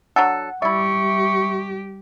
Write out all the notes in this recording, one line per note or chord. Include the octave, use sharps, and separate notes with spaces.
F#3 D4 A4 F#5
G3 E4 G4 D5 E5 C#6